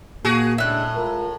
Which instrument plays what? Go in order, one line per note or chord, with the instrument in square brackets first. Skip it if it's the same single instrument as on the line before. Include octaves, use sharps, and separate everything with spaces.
[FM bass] A#2 [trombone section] A#3 [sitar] F#4 G#4
[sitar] A2 [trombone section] C#3 G#3 D4 [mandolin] E5 F#6
[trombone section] G#3 F4 A#4